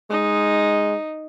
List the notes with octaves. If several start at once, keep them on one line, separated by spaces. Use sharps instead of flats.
G#3 D#4